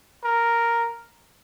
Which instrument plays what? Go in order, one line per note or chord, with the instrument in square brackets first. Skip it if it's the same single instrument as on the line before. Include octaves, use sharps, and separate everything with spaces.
[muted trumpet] A#4